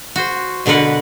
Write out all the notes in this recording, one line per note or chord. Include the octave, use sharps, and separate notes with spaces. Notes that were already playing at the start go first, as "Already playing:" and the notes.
F#4 C5
B2 D3 A#4 B4 F#5